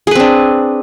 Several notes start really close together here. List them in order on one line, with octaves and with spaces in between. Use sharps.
G#4 B4 C4 D4